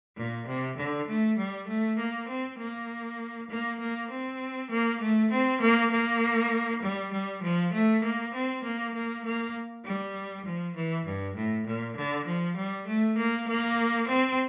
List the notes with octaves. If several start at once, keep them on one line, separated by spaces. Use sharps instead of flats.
A#2
C3
D3
A3
G3
A3
A#3
C4
A#3
A#3
A#3
C4
A#3
A3
C4
A#3
A#3
G3
G3
F3
A3
A#3
C4
A#3
A#3
A#3
G3
F3
E3
G2
A2
A#2
D3
F3
G3
A3
A#3
A#3
C4